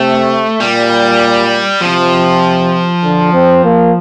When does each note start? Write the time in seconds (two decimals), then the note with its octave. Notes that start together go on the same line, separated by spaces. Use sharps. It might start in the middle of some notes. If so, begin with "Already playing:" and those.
Already playing: C3 A3
0.60 A#2 G3
1.81 C3 F3
3.04 D3
3.33 C4
3.64 A#3